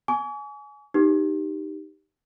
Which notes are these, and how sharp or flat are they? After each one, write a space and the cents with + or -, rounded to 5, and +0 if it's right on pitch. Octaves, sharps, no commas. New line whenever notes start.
G#5 +15 C#6 +45
D#4 -5 G4 +0 B4 +10